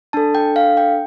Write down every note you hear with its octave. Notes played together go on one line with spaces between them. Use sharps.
D4 A4 A5
G5
F5
G5